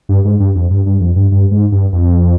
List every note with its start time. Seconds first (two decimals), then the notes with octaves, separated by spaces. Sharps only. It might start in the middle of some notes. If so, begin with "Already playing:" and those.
0.09 G2
0.25 G#2
0.40 G2
0.55 F2
0.70 G2
0.86 G2
1.00 F2
1.16 G2
1.31 G2
1.51 G#2
1.72 G2
1.93 F2